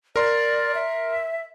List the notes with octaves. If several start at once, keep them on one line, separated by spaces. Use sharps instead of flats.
A#4 D5 C6
E5